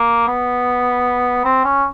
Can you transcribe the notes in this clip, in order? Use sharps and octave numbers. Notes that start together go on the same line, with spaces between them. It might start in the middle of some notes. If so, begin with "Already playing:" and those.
Already playing: A#3
B3
C4
C#4